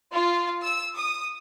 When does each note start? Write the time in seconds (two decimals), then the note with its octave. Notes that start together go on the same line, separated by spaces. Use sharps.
0.12 F4
0.63 E6
0.96 D#6